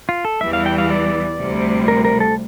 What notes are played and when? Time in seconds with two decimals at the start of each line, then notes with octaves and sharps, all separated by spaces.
0.09 F4
0.25 A4
0.41 E2 E3 G3 E5
0.53 F5
0.66 G5
0.78 F5
0.90 D5
1.39 D2 C3 G3
1.88 A#4
2.05 A#4
2.20 A4